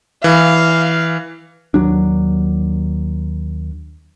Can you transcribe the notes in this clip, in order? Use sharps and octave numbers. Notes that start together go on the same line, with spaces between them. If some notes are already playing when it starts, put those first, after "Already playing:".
E3 F5
D#2 F#3 D4